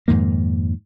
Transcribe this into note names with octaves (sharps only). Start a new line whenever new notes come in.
F2 G#2 D#3 A#3